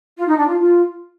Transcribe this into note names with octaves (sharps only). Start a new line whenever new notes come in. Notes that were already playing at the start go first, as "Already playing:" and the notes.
F4
D#4
D4
F4
F4